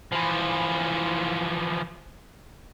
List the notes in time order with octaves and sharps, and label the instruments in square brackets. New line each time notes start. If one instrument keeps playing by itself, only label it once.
[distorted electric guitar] E3 F3